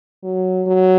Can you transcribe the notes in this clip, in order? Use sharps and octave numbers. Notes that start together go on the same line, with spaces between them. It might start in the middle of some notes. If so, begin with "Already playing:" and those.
F#3
F#3